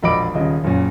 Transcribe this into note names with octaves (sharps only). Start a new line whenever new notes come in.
E1 A#1 D#5 B5 D6 D7
D#1 C#3 D#5
F#1 A#2 C#4